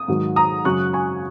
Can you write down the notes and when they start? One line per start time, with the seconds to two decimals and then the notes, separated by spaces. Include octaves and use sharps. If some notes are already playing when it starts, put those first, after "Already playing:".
Already playing: D#6
0.08 G#2 D#3 F#3
0.36 A#5 D#6
0.64 F#2 C#3 F#3 C#6 F#6
0.93 G#5 C#6